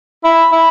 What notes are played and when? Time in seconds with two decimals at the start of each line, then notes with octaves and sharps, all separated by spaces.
0.24 E4
0.52 E4